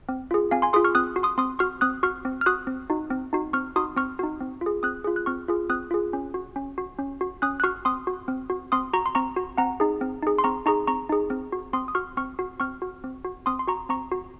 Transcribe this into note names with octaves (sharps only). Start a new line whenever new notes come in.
C4
F4 G#4
C4 F5 G#5
G#5 C6
F4 G#4 C6 D#6
C#6 F6
C4 D#6 F#6
F#4
C6 D#6
C4 C6 D#6
F#4 C#6 F6
C4 D#6 F#6
F#4 C#6 F6
C4
F6
F#4 D#6 F#6
C4
D#4 F#4
C4
D#4 F#4
C4 C#6 F6
D#4 F#4 C6 D#6
C4 C#6 F6
D#4 F#4
C4
F4
G#4
C4 D#6 F#6
F4 G#4
F#6
C4 C#6 F6
F4 G#4
C4 D#6 F#6
F4 G#4
C#4
F#4
C#4
F#4
C#4
F#4
C#4 D#6 F#6
F#6
F#4 C#6 F6
C4 C6 D#6
F#4
C4
F#4
C4 C6 D#6
F#4 A#5 C#6
C6
C4 A#5 C#6
F#4
C4 F#5 A#5
D#4 G#4
C4
D#4 G#4
C6
C4 A#5 C#6
D#4 G#4 A#5 C#6
C4 A#5 C#6
D#4 G#4
C4
F#4
C4 C6 D#6
D#6
F#4 C#6 F6
C4 C#6 F6
F#4
C4 C#6 F6
F#4
C4
F#4
C4 C6 D#6
C6
F#4 A#5 C#6
C4 A#5 C#6
F#4